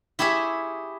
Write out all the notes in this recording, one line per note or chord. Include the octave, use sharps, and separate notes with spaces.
E4 G4 G#4 C#5 E5